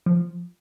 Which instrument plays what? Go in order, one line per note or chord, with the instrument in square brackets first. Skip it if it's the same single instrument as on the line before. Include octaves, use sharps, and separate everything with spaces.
[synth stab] F3